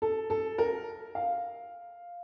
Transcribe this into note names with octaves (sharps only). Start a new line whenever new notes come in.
A4
A4
A#4
F5